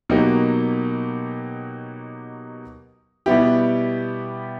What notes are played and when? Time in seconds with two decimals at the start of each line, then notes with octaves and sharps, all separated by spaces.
0.09 B2 F#3 A#3 D#4 G4
3.26 B2 G3 B3 E4 G4